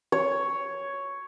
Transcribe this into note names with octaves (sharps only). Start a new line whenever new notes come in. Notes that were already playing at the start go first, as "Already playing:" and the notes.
C#5